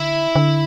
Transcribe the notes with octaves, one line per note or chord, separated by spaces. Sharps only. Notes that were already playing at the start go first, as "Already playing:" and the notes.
Already playing: D3 E4
D3